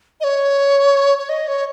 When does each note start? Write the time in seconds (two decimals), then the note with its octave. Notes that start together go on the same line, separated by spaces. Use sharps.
0.21 D#5
0.24 C#5
1.18 C#5
1.29 D#5
1.48 C#5